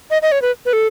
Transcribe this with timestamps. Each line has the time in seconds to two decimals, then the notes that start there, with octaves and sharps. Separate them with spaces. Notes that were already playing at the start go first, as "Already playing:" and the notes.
0.10 D#5
0.22 D#5
0.32 C#5
0.42 B4
0.66 B4
0.73 A4